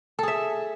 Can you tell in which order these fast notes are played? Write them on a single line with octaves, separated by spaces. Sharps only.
A4 G#4 E5